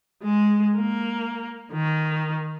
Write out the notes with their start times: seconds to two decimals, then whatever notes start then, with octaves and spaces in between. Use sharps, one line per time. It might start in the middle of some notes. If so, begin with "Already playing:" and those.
0.24 G#3
0.77 A#3
1.73 D#3